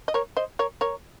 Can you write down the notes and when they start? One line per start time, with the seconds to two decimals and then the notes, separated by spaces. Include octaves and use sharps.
0.08 D#5
0.14 A#4 C#5
0.37 C5 D#5
0.59 A#4 C#5
0.81 A#4 C#5